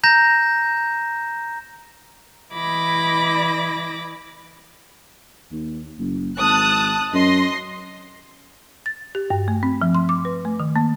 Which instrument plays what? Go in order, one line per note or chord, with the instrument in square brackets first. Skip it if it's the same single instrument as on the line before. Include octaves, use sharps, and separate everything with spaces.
[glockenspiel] A#5 G6 A#6 E7
[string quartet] E3 E4 D#5 B5 D6 A#6
[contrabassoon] D#2
F#1
[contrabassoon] G#1 [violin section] A5 D#6 F#6
[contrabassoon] F#2 [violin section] D#5 C6
[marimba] A6
G4
G2
A3
C4
F3
C6
D6
B4
A3
D#3
A#3